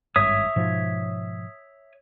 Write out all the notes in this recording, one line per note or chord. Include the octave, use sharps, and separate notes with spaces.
G#1 G2 C#5 E5 D#6
G#2 B2 F3